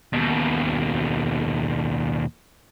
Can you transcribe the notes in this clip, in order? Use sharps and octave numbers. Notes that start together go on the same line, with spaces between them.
D#2 B2